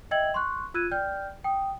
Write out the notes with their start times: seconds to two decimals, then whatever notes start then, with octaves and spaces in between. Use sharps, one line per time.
0.11 D#5 E5 G5 E6 G#6 F#7
0.34 C6 C#6 F#6
0.74 F4 E6 F#6 G#6 D#7
0.91 D5 G5 F6 G6
1.44 G5 D#6